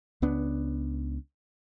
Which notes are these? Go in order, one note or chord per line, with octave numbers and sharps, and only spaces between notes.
C#2 B3 D4